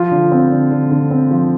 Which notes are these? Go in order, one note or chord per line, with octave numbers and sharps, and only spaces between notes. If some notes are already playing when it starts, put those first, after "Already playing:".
Already playing: F3 F4
D3
C4
D3
D3
D3
C4
F3